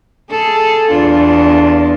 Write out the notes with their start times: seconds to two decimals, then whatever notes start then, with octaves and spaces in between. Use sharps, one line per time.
0.30 G#4 A4
0.90 E2 D4 F4